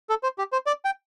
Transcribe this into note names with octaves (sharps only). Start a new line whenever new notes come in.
A4
C5
G4
C5
D5
G5